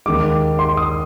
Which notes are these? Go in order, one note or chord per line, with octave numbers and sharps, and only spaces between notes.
D#2 D#3 G#3 D6
C6
D#6